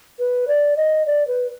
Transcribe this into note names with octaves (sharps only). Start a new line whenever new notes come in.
B4
D5
D#5
D5
B4